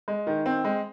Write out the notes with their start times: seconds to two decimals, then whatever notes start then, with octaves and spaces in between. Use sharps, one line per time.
0.08 G#3
0.27 D#3
0.46 C4
0.64 G#3